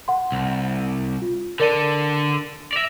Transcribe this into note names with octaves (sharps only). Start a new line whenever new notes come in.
F#5 C6
C2
F4
D3 A4 A#4 D5 D#7
D5 E5 A#6 D7 F7